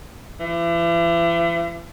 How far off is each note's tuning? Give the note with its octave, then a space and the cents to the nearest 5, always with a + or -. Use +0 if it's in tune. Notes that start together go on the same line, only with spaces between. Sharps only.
E3 +40